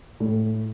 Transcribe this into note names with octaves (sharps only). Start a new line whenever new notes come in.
A2